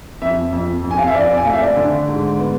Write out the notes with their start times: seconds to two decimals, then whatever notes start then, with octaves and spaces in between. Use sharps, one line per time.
0.22 F2 E5
0.53 F2
0.84 F2
0.91 G#5
0.98 F5
1.07 E5
1.15 F2 D5
1.37 G#5
1.44 A3 F5
1.53 E5
1.61 D5
1.77 D3
2.08 G#2
2.39 B3